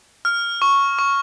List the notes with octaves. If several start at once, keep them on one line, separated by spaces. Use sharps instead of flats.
F6
C#6
C#6